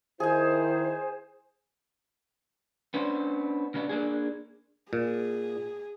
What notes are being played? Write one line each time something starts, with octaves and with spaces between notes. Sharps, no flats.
D#3 E4 G#4 C5 G#5
B3 C#4 D4 C5
C#3 B3 C#4 D4
A#3 D4 G#4
A#2 G#4